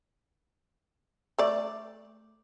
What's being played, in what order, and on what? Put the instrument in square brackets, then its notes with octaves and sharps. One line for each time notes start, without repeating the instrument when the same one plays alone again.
[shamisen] A3 D5